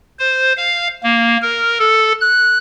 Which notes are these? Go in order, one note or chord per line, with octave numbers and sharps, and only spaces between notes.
C5
F5
A#3
A#4
A4
F#6